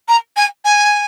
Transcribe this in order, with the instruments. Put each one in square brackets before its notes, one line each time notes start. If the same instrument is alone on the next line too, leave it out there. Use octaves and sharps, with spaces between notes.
[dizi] A#5
G#5
G#5